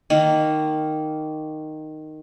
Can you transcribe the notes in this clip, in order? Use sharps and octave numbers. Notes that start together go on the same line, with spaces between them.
D#3 A#3